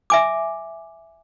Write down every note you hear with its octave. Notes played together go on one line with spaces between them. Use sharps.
E5 G#5 D6